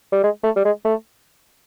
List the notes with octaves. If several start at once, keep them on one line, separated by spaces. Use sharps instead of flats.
G3
G#3
A3
G3
G#3
A3